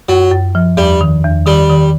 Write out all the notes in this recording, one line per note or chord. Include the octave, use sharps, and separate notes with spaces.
F#2 F#3
F#2
F3
E2 G3
D#3
E2
D#3 G3
D#3